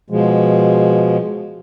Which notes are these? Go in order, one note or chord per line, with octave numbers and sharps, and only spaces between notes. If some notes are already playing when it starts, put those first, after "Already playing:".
B2 F3 G#3